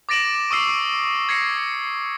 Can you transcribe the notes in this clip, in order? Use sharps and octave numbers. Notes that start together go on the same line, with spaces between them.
D6 A6 A#6 D7 E7 F#7
C#6 D#6 E6 C7 D7
G#6 A#6 C7 C#7